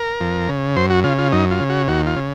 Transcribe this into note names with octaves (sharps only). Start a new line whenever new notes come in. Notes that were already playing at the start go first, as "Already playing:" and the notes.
Already playing: A#4
F2
C#3
F#2 C5
F#4
C#3 F4
F4
F#2 D#4
F4
C#3
F#4
D#2 F#4
F4
C#3